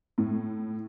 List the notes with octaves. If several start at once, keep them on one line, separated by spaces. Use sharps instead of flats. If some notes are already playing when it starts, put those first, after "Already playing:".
A2